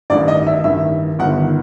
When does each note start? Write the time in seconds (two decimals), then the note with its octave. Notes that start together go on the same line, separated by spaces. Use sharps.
0.10 A1 G2 D#3 D5
0.28 D#5
0.47 E5
0.64 A1 G2 D#3 E5
1.19 G1 F#5
1.22 G2 D#3